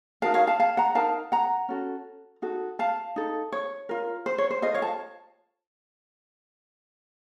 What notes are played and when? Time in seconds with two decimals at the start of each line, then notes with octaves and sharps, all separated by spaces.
0.22 D#4 F#4 A#4 F5 A5
0.34 C#5 F5
0.47 F5 A5
0.60 F5 A5
0.77 F#5 A#5
0.95 D#4 A#4 F5 A5
1.32 F#5 A#5
1.69 C#4 F#4 A4
2.42 D#4 F#4 A4
2.79 F5 A5
3.16 D#4 A4
3.52 C#5
3.89 F4 A#4
4.26 C5
4.38 C#5
4.50 C5
4.62 F4 A4 C5 D#5
4.74 C#5 F5
4.82 A5